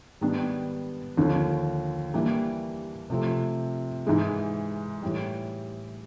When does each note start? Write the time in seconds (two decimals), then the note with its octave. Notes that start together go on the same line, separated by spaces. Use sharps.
0.21 G#2 D#3 G3 B3 D4
1.17 D#2 D3 F3
2.14 E3 G3 A#3 D4
3.10 C3 F3 A3 C4
4.07 G#2 E3 G#3
5.03 A2 E3 G3